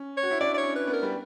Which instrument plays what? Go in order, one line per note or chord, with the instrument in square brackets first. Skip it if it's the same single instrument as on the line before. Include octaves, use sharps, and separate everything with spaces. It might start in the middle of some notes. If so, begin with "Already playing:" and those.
Already playing: [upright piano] C#4
[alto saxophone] C#5
[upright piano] F#4
E4
[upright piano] D4 [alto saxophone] D5
[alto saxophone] D5
C#5
[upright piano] C#4
[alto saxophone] B4
[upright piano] B3
[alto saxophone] A#4
[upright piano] G3